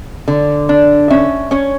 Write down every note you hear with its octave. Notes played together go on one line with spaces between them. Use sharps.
D3
D4
C#4 E5
C#4 C#5